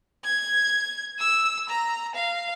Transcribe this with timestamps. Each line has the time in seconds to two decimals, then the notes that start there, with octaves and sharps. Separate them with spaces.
0.25 G#6
1.19 E6
1.69 A#5
2.15 F5